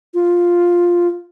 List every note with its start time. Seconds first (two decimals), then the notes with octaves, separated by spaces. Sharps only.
0.14 F4